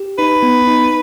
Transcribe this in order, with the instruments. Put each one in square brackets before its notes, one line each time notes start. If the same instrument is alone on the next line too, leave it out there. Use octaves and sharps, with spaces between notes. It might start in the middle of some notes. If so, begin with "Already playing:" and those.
Already playing: [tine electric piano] G4
[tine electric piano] D#4 [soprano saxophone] B4
[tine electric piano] B3
D#4